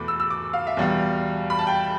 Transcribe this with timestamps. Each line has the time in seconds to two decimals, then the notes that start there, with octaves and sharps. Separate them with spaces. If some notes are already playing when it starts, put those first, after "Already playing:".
Already playing: E2 B2 A3 B5 D6
0.08 E6
0.20 E6
0.30 D6
0.53 F5
0.67 E5
0.77 E2 B2 G3 F5
1.50 B5
1.59 A5
1.67 G5